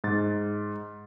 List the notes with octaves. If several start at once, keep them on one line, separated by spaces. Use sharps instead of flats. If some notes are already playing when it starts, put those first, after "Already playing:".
G#2 A6